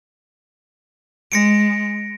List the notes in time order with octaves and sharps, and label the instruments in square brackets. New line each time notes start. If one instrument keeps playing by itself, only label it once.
[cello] G#3 [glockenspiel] A#6 C#7 D7